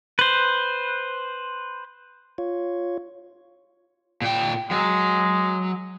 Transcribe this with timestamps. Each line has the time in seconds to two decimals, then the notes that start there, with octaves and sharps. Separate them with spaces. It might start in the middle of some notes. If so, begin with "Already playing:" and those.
0.19 B4 C5
2.38 F4 C#5
4.22 A#2 G5
4.71 F#3 G#3